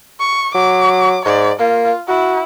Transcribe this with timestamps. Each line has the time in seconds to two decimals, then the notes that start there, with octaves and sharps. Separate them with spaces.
0.20 C#6
0.55 F#3 D6
1.25 G#2 D5
1.60 A#3 F4
2.08 E4 F#4